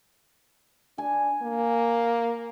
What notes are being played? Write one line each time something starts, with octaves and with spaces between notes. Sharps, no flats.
D4 G#5
A#3